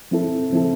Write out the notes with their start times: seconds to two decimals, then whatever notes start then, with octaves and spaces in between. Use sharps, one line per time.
0.11 F3 C4 E4 A4
0.52 F3 C4 E4 A4